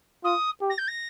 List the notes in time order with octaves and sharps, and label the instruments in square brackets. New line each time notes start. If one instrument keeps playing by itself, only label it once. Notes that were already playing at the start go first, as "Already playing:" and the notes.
[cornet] F4 [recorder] D#6
[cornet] G4
[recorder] A#6
G6
A#6